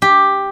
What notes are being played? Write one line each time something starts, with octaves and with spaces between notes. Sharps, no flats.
G4